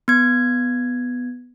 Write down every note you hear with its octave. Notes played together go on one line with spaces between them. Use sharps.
B3 G#6